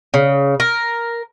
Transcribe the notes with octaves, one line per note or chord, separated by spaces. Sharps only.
C#3
A#4